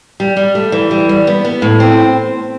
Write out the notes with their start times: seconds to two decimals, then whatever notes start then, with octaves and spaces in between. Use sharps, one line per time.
0.20 G3
0.37 G3
0.55 A3
0.72 E3
0.91 G3
1.09 G3
1.27 B3
1.45 B3
1.62 A2
1.80 C4